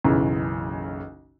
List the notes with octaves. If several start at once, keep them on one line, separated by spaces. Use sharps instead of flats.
F#1 B1 C#3 E3